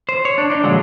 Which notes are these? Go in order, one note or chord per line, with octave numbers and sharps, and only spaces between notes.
C5
C#5
D4
D4 D#4
A#2 D3 F3 F#3 G#3